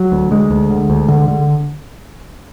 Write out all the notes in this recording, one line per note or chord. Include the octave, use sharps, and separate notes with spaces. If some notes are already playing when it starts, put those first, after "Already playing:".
Already playing: F#3
D2
D2 G#3
D2
D3
D2
D3
D3